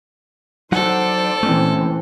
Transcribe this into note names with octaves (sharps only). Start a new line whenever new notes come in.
F#3 D#4 A4 C5 D5 F#5
A#2 E3 A3 C4 C#4